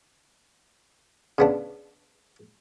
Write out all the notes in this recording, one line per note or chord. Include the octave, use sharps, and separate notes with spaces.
C#3 B3 D4